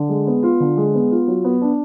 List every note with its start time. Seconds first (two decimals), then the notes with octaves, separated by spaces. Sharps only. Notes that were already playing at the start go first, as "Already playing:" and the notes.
Already playing: D3
0.09 G#3
0.27 B3
0.43 F4
0.60 D3
0.77 G#3
0.95 B3
1.11 F4
1.28 F#3
1.44 B3
1.61 D4